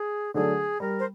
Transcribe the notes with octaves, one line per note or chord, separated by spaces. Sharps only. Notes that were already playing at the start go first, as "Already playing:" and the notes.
Already playing: G#4
D3 F#3 A3 D4 G#4
G3 A#4
C5